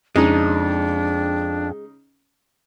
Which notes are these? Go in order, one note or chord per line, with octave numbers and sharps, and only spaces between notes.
F2 C#3 G#3 D4 D#4